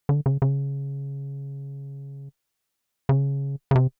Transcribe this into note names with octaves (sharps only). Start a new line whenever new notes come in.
D3
C#3
C#3
C#3
C#3
C3